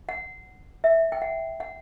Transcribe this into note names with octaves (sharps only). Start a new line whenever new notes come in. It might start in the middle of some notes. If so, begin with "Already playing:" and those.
F#5
E5
G5
F#5
F#5